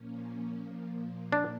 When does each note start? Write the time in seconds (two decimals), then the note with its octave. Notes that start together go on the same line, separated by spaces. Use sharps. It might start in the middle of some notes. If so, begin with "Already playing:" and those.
Already playing: A#2 F3 A#3 C#4
0.58 A#2 F3 A#3
1.32 D4